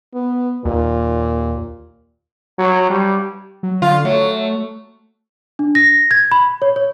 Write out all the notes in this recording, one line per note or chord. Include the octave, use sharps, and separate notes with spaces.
B3
D#2 A#2
F#3
G3
F#3
D3 F4
F#3 A3
D4
A#6
G#6
B5
C#5
C#5